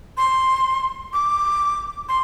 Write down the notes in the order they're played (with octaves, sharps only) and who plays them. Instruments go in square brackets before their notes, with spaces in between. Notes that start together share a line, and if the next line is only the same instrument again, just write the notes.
[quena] C6
D6
C6